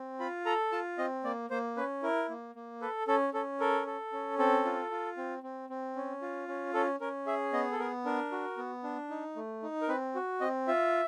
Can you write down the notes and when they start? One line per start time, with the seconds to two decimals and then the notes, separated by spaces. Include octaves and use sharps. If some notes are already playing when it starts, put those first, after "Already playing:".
Already playing: C4
0.20 F4 B5
0.46 A4 A#5
0.72 F4 A5
0.98 C4 D#5
1.24 A#3 D5
1.50 A#3 C5
1.77 C#4 B4
2.02 E4 A#4
2.29 A#3
2.55 A#3
2.81 A4 B4
3.07 C#4 A4
3.34 C#4 A4
3.60 A4 A#4
3.86 A4
4.13 C#4
4.38 C4 A4
4.65 F4
4.91 F4
5.17 C4
5.43 C4
5.70 C4
5.96 C#4
6.22 F4
6.48 C#4
6.74 C#4 A4
7.00 C#4 A#4
7.27 G#4 E5
7.53 B3 D#5
7.72 A4
7.79 B3 A#4
8.05 D4 A#4
8.32 F#4
8.57 B3
8.84 D4
9.10 D#4
9.36 A3
9.63 D#4
9.81 A#4
9.88 C4 B4
10.15 F#4
10.41 C4 D#5
10.67 F4 E5